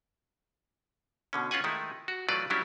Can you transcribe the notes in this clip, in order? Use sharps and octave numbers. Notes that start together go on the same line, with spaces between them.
B2 D3 C#4
C#4 F4 B4 F#5 G#5
D#3 G#3 A3 D#4 E4
F#4
E3 F#3 A3 F4 B4 D5
F#3 G3 C#4 D4 E4 G4